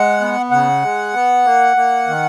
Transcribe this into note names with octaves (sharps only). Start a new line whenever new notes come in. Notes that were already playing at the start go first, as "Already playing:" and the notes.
Already playing: G#3 F#5
B3
C#3 F#5
G#3
B3
A#3
A#3
D#3